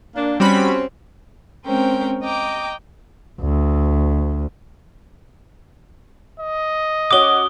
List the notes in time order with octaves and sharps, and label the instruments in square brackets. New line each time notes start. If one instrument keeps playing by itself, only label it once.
[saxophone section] A#3 D4
[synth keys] G3 F#4 B5 [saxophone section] C4 C#4
[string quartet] G#3 C4 C#4 A#4 C5 G5
D#5 G5 A#5 D6
[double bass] D2
[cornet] D#5
[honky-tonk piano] C#4 F#4 D6 [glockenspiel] D#6 G7